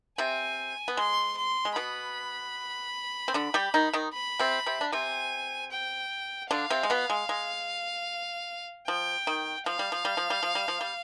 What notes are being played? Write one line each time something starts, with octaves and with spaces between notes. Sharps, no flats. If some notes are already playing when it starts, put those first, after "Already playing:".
C3 C4 G#5
B3
G#3 C6
C6
G#3
B2 B3 B5
C4
D3 D4
G3 G4
D#3 D#4
D#3 D#4
B5
C3 C4
C3 C4
D4
C3 C4 G#5
G5
D3 D4 F5
C3 C4
G#3
B2 B3
G#3
G#3
F3 G5
D#3
F3 F5
G3
F3
G3
F3
G3
F3
G3
F3
G3